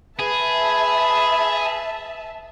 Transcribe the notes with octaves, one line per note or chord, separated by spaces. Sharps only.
G#4 B4 E5 A5